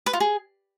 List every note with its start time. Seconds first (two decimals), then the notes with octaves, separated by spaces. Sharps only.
0.06 B4
0.13 F4
0.20 G#4